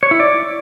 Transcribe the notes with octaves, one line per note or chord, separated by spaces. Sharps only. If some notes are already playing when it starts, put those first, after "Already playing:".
C#5
E4
D5